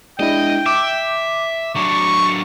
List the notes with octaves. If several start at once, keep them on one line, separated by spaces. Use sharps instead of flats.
G#3 D4 E4 D#5 G5
E5 D6
F#3 D4 C#6